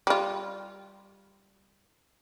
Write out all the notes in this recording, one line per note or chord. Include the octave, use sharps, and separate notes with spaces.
G3 F4